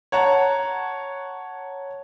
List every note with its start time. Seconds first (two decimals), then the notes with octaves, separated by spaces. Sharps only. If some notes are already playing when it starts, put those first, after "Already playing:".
0.12 C#5 F#5 A5 A#5